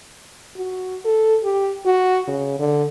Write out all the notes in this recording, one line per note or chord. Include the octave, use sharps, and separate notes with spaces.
F#4
A4
G4
F#4
C#3
D3